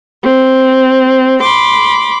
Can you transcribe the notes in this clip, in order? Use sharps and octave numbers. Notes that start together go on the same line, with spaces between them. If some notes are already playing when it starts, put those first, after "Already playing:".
C4
B5 C6 D6